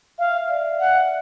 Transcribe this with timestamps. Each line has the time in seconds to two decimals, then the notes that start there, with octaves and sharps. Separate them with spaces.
0.18 E5 F5
0.29 E5
0.39 F5
0.48 D5
0.80 F#5